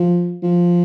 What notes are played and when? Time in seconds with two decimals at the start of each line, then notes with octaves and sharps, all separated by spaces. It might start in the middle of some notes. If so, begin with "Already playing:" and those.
Already playing: F3
0.43 F3